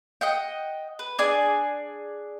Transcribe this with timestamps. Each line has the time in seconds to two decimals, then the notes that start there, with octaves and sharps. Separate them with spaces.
0.21 D#5 F#5 G5
0.99 B4
1.19 D4 G#4 D5 G#5